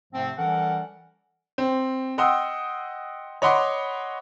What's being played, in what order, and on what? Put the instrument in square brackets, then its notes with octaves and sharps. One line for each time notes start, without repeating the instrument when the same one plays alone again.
[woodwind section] G#2 C3 F3 A3 C4
E3 G3 C#4 A4 A#4 F#5
[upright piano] C4
D#5 F#5 G5 C6 D#6 E6
C#5 D#5 F#5 B5 C6 D6